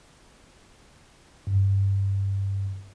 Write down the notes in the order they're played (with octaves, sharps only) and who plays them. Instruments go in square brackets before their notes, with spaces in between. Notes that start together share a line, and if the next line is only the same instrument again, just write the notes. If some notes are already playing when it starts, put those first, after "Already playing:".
[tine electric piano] G2